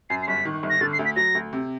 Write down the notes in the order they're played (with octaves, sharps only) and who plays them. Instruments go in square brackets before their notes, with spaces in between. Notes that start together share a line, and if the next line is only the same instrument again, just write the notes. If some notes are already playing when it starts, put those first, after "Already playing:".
[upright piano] F#2 [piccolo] C7
[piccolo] C7
[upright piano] G1 [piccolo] B6
[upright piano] D#3
G1
[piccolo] A#6
[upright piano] D3 [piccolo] A6
[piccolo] C7
[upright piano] D2
[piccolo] B6
[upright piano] F#3 [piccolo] A#6
[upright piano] D2
C3